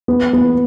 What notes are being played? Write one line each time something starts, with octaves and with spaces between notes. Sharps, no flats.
B3
B3